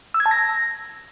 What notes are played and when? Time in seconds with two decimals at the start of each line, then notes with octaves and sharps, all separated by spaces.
0.14 E6
0.20 G#6
0.26 A5
0.31 A#6